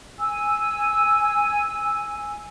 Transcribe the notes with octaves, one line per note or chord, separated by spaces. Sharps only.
G#5 E6